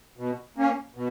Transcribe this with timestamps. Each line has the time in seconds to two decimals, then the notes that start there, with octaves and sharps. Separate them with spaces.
0.17 B2
0.56 A#3 C#4
0.95 B2